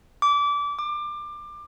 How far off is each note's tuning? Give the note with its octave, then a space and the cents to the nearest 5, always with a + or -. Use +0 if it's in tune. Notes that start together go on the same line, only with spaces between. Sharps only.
D6 -25
D6 +25